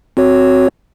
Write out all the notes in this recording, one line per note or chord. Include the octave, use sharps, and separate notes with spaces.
C4 F#4 C#5